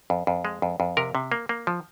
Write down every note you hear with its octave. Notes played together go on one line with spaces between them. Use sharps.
F2
F2
G#3
F2
F2
C3 A#4
C3
A#3
A#3
F3